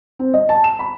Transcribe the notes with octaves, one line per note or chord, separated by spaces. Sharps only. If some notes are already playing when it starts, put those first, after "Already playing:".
C4
D#5
A5
E7
B5